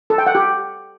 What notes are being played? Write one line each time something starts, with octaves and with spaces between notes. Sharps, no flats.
A4
G5
F#5
G4